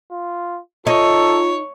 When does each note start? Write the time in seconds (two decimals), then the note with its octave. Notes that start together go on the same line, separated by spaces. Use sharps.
0.11 F4
0.87 D#4 F4 A4 C#5